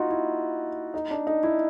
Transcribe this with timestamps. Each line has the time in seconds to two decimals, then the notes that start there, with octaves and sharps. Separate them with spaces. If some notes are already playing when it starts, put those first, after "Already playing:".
Already playing: D#4 F4 F#4
0.10 E4
0.94 D#4
1.11 D4
1.27 D#4
1.43 E4